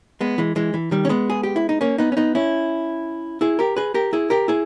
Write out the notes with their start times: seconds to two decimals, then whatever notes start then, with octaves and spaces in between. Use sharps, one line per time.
0.21 G#3 B3
0.38 E3 G#3
0.56 E3 G#3
0.74 E3
0.91 D#3 G3
1.05 C#4
1.09 G#3 B3
1.30 G#4
1.43 G4
1.56 E4
1.69 D#4
1.81 A#3 C#4
1.98 B3 D#4
2.12 C#4
2.17 B3 D#4
2.35 C#4 E4
3.41 E4 G#4
3.59 G4 A#4
3.77 G#4 B4
3.94 G4 A#4
4.13 E4 G#4
4.30 G4 A#4
4.48 E4 G#4